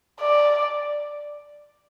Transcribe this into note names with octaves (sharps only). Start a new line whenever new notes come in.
D5